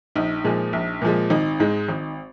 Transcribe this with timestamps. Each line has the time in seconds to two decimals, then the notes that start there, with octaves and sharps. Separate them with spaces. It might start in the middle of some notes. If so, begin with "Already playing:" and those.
0.16 A#1 D#4
0.44 A#2 F3 G#3
0.73 A#1
1.02 A#2 F3 G#3
1.30 G#1 D#4
1.60 G#2 G#3
1.89 G#1